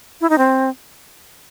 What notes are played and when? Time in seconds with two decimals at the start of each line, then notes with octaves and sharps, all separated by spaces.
0.21 E4
0.30 D#4
0.38 C4